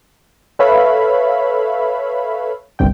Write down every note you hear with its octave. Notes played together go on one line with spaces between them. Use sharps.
A4 B4 C#5 E5 F5 B5
G1 C2 G2 G5